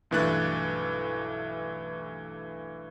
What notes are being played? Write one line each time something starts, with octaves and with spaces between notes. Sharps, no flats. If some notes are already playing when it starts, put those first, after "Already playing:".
B1 G2 E3 A3 F#6 A6